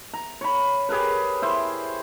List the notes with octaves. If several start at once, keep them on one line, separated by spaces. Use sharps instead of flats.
A#5
C#5 B5
G4 G#4 A#4 B4
E4 C5